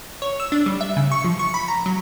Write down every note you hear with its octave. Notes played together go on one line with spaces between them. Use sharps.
C#5
E6
D4
G3
E5
C#3
C#6
F3
C#6
B5
A#5
F#3